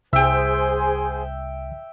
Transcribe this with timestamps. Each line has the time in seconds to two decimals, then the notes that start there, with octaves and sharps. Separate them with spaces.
0.13 C2 G#4 C5 E5 G5 G#5 E6